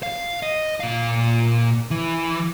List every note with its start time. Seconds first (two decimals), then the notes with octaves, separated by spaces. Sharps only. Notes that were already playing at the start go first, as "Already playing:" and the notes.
0.03 F5
0.43 D#5
0.80 A#2 F5
1.91 E3